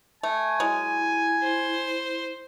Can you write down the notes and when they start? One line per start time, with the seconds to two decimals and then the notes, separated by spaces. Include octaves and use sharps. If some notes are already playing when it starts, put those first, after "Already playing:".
0.23 A3 G#5
0.60 F#3 G#3 E4
1.43 C5